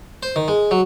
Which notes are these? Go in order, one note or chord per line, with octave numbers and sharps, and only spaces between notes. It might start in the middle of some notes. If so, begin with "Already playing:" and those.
C5
D#3
G#3
F#3